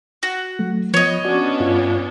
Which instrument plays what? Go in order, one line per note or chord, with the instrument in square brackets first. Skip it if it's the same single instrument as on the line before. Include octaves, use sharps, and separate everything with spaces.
[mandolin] F#4
[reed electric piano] F#3 A3
[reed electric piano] F3 [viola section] B3 [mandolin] C#5 D#5
[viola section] B3 C#4 D4 [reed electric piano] F#4 D5
[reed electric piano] G2 F4